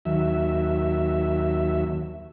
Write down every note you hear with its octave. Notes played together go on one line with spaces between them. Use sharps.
D#2 F#3 E5